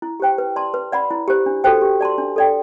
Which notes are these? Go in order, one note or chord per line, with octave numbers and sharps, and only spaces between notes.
E4
G4 C5 G5
B4
D5 A5 C6
B4
D5 F#5 B5
E4
G4 C5
D4
F#4 A4 C5 G5
G4
D5 A5 C6
D4
A4 D5 G5